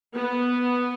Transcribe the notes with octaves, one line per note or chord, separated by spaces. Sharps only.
B3